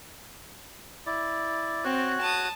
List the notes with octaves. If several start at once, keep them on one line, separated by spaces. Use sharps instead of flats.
E4 D5
C4 F#4 C#5 F#6
A5 D#6